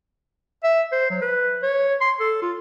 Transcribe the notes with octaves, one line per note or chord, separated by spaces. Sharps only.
E5
C5
F#3
B4
C#5
C6
A4
F4